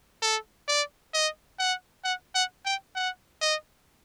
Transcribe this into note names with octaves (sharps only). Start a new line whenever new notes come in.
A4
D5
D#5
F#5
F#5
F#5
G5
F#5
D#5